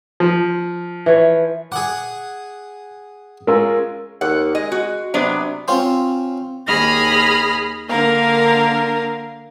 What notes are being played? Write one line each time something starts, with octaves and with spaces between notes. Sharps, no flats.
F3
E3 C#5
G#4 F#5 D6
G#3 C#4 F4 A#4 E6
D#2 F#5
G#3 D#5
F#4
C3 F#3 B3 D4
C4 C#4 F4
D#2 G#4 B5 F6 A#6
D3 A#3 A#4 F5